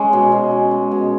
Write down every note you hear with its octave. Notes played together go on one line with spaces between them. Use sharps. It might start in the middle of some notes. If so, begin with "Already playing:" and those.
Already playing: G#3 C#4 G#4
B2
B2
C#4
G#3
B2